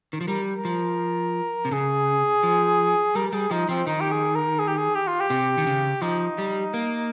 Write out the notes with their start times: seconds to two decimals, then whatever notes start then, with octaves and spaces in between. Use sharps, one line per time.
0.13 D#3
0.21 F3
0.28 G3 A#4
0.56 A#4
0.65 F3
1.65 C3
1.71 C#3 G#4
2.43 F3
3.15 G3 A#4
3.28 A#4
3.33 G3 G#4
3.51 F3 D#4
3.69 F3 C4
3.87 D#3 D#4
4.00 G4
4.11 G#4
4.35 A#4
4.59 G#4
4.67 G4
4.77 G#4
4.95 G4
5.07 F4
5.20 G4
5.30 C3
5.58 D#3
5.67 C#3
6.02 F3 D#4
6.38 G3
6.74 A#3